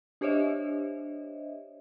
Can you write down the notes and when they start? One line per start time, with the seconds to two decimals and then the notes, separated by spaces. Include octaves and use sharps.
0.21 D4 G4 C5 C#5 D#5 E5